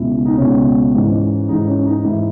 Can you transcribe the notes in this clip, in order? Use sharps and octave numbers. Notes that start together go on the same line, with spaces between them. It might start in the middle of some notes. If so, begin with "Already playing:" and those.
Already playing: C#2 B2 E4
D#4
C#2 B2 C#4
G#2 E3
G#2 E3 D#4
C#4
D#4
G#2 E3 E4